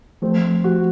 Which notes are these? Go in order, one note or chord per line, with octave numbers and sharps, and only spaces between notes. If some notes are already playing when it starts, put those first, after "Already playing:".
F3 A3 C4
F#4